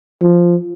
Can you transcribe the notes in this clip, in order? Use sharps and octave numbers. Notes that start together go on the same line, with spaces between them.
F3